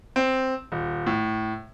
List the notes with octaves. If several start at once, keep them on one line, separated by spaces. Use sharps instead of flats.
C4
D#1
A2